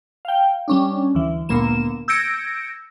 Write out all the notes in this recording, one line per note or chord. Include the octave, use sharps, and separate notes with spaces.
F5 G5
G3 C#4 D4
D2 E3
G#1 D2 A#2 A#3 B3 E7
E6 G6 G#6 A#6 C#7 D7